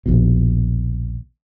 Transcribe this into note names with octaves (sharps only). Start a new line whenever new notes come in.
A#1 D#2 B2